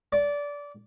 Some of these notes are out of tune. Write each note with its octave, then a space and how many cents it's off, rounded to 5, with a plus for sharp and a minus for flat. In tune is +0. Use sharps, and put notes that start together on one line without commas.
D5 -20